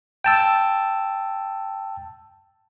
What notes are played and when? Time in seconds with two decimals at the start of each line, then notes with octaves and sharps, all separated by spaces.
0.24 G5 A5 E6